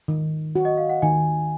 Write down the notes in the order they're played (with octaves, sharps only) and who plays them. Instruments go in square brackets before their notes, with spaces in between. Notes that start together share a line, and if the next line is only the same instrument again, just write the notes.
[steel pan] D#3
F#4
[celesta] D#5
F5
F#5
[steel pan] D#3 [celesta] G#5